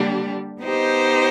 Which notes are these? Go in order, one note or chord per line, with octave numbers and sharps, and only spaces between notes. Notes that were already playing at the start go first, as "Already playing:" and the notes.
Already playing: D3 G3 A#3 D4 G4
B3 D#4 G4 C5 D#5